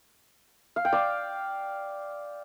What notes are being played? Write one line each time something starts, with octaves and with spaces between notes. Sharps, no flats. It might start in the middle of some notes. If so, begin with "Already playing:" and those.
F5
G5
D5 F5